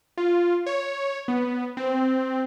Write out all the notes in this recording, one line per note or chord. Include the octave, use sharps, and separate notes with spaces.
F4
C#5
B3
C4